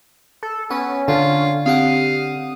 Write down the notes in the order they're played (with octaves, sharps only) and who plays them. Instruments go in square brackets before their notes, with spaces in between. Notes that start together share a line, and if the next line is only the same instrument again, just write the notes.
[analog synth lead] A4
[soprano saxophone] B3 [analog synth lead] C#4 [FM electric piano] F#5 G#5
[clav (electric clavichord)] D3 [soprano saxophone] F4 [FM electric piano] A5
[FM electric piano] C4 G4 F#5 [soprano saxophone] F5 [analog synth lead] D#6